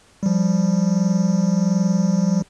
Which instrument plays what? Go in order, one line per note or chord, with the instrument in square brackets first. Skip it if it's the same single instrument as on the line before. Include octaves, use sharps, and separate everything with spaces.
[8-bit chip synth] F3 G3